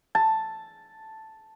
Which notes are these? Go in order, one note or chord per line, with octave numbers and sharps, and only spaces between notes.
A5